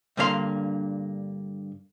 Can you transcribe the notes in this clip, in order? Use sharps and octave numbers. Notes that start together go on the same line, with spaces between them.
G2 D3 A#3 C4 F5 C6